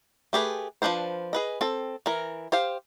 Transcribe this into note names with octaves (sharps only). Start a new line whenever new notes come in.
A3 G4 G#4 B4
F3 A3 D4 B4 C5
G#4 B4 D#5
C4 A4
E3 A#4
G4 C5 F5